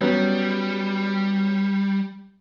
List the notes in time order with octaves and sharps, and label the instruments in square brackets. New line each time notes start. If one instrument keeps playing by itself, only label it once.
[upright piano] F#3 B3 C#4 [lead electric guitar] G3